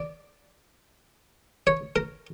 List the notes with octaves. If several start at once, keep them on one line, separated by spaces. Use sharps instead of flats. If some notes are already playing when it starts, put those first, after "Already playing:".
Already playing: D5
C#5
A#4